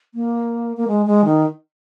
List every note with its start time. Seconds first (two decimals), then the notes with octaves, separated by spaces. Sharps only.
0.15 A#3
0.77 A#3
0.88 G#3
1.06 G#3
1.25 D#3